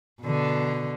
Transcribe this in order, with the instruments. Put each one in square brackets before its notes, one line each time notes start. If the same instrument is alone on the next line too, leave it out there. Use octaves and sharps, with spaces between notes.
[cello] B2 D3